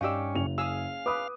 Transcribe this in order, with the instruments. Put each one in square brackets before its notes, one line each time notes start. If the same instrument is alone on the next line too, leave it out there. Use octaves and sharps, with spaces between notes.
[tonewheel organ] G2 C#4 [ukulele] D#4 G4 D5 [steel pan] F5 E6
[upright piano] F#1 F7
[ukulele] C#4 G#4 [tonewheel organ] F5 [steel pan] D#6 E6
[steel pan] B4 [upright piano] D6 D#6